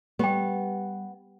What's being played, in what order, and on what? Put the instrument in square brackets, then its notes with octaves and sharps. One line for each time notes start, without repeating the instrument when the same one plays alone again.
[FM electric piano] G3 [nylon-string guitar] B3 [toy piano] G4 G5